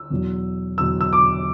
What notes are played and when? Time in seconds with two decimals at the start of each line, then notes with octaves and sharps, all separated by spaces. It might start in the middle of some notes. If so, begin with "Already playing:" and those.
Already playing: E6
0.10 E2 B2 F#3
0.78 E2 B2 F#3 E6
1.01 E6
1.13 D6